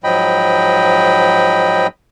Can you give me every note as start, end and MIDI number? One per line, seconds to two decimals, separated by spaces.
0.04 1.87 44
0.04 1.87 53
0.04 1.87 54
0.04 1.87 75
0.04 1.87 79
0.04 1.87 83